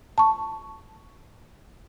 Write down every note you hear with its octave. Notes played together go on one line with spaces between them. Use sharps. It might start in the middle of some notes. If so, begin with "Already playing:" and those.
A5 C#6